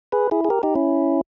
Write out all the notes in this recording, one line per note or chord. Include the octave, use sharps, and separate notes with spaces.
G#4 B4
E4 G#4
G#4
G4 A#4
D#4 G4
C#4 E4